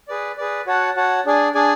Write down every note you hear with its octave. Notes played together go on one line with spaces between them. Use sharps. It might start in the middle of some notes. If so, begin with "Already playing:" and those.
G#4 B4 D5
G#4 B4 D5
F#4 C#5 F#5 A5
F#4 C#5 F#5 A5
D4 G#4 D5 G#5
D4 G#4 D5 G#5